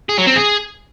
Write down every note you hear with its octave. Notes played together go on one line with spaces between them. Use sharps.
G#4
F#3
C4
G#4